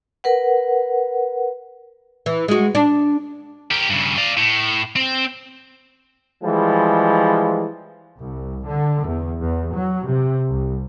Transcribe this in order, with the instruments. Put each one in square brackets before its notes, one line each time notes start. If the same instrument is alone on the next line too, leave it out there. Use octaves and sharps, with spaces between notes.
[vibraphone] A#4 B4 F#5
[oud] E3
G#3 F#4
D4
[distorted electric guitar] G4 A#4
G2 C#3
D5 F5
A2
C4
[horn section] E3 F3 G3 G#3
[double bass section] C2
D3
E2
E2
F#3
C3
C2